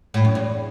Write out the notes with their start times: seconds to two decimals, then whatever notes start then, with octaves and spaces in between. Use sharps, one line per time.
0.14 A2
0.25 F#2
0.35 E2